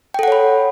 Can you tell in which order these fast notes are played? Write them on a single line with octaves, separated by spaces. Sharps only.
G5 A4 F#5 C#5 B5